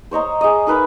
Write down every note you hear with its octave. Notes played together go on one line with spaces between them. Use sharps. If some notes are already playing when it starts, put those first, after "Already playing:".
C5 C#5 D#5 A#5
G#4 D#5
D#4 A#4 B4 E5